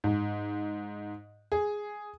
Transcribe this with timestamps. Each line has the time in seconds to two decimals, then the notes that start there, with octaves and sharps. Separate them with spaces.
0.04 G#2
1.52 G#4